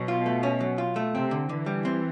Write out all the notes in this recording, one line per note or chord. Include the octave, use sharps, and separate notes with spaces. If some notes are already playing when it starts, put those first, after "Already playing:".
Already playing: B2 F#3
F4
A3
C#4
F#3
F4
A3
C3 C4
D3
D3 E3
G3
C4